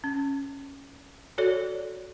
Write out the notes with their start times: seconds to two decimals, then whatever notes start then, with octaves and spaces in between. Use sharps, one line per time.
0.04 C#4
1.38 F#4 A4 C#5 D5